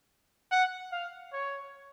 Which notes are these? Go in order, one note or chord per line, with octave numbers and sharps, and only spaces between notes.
F#5
F5
C#5